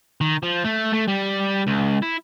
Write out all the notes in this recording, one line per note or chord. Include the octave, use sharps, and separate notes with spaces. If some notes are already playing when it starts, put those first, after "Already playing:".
D#3
F3
A3
A3
G3
C#2
E4